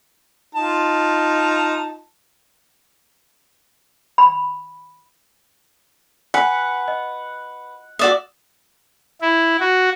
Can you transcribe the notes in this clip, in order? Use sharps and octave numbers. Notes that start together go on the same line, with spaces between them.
D#4 F4 A5
B5
B4 F#5 G#5 B6 C#7
D#5
F#4 D5 E5 D#6 E7
E4
F#4